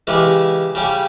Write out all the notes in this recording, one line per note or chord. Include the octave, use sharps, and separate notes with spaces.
C#3 E3 G#3 C#4 G4
C#3 G3 C#4 G4